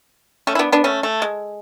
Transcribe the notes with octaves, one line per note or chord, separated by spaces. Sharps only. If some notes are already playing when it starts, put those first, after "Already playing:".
A3 C#4
E4
B3 D4
B3 D4
A3 C#4
A3
G#3